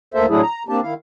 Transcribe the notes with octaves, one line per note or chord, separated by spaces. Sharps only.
D2 A#3 A4 C5 E5
A2 F#3 A3 D4 E4 G#4
A#5
A#3 C4 D4 G4 A5
D#3 E4 F5